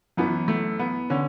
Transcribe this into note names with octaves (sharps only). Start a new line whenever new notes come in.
F#2 E3 B3
A3
B3
D3 C#4